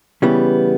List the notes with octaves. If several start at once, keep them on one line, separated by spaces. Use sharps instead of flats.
C#3 E3 G3 B3